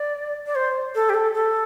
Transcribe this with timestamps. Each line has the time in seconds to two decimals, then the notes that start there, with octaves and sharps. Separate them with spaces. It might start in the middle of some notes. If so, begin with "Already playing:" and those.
Already playing: D5
0.47 D5
0.55 C5
0.95 A4
1.10 G4
1.14 A4
1.34 A4